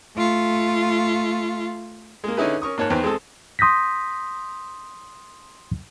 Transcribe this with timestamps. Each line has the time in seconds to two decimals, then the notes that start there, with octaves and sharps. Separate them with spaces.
0.17 A3 F4
2.24 G#3 A#3
2.37 D3 C#4 D#4 E4 G#4 B4
2.62 C#4 A#4 C#6 D#6
2.78 G#2 A#3 C#5 A5 F#6
2.90 E2 D#3 B4 C5
3.03 G#3 C4 G#4 A4
3.59 C6 D#6 G6 A#6 B6